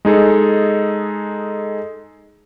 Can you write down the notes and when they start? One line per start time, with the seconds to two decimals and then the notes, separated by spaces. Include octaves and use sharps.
0.05 G#3 D#4 G#4 A4